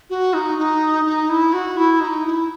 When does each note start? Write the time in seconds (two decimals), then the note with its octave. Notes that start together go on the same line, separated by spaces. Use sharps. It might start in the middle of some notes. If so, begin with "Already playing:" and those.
0.10 F#4
0.34 D#4
0.58 D#4
1.06 D#4
1.29 E4
1.53 F#4
1.77 E4
2.01 D#4
2.25 E4